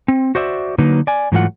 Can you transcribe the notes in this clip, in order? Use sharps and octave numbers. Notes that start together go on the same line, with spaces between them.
C4
F#4 C5 D5 E5
D3 F#3 A#3 D#4 B4
D5 G#5
G#2 E3 F#3 A3 F4 F#5